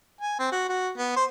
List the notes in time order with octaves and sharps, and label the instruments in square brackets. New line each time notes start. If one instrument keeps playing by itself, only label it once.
[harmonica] G#5
C4
F#4
F#4
B3
C5